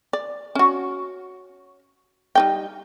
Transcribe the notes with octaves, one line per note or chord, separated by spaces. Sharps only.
D5
C#4 F#4
G3 D#4 G5